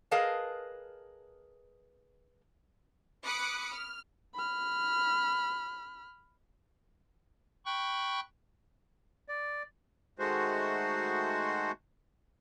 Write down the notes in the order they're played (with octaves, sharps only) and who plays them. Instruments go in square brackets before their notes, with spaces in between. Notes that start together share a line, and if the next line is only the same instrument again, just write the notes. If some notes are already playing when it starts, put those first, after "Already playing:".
[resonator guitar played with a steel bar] G#4 A#4 B4 D#5 F5 A5
[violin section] B5 D6 D#6 F#6 C#7
F6
[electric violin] B5 F6
[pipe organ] G5 B5 C#6 F#6
[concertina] D5
[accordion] D#3 G#3 A3 F#4 C5